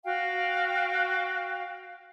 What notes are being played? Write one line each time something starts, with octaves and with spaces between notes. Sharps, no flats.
F#4 F5 G5